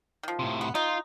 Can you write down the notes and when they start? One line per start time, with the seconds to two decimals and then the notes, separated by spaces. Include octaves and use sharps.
0.23 D#3 F3
0.39 A2 C3
0.61 B3
0.75 D#4 F4